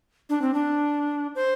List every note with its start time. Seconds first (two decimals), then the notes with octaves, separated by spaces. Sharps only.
0.29 D4
0.42 C4
0.54 D4
1.35 C5